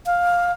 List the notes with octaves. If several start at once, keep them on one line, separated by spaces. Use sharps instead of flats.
F5